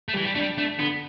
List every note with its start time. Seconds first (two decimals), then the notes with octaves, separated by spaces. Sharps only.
0.08 A3
0.13 G3
0.17 E3
0.25 G3
0.35 A3 D4
0.41 G3
0.58 A3 D4
0.79 D3 B3